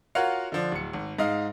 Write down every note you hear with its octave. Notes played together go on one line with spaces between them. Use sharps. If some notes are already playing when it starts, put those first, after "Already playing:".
F4 F#4 A#4 C#5 F5 F#5
D3 F3 D4
D1 C#7
G#1
G#2 D#5 F5